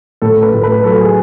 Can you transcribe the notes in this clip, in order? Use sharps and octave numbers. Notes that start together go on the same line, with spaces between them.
A2 A4
B4
A2
B4
F#3 A4
G#4